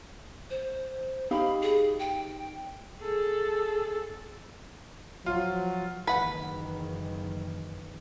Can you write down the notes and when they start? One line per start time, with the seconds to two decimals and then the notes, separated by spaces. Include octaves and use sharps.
0.50 C5
1.31 D#4 G4 F5 B5
1.62 G#4
1.99 G5
3.01 G#4 A4
5.26 F3 F#3 F4
6.07 F#1 D#3 E3 B4 F#5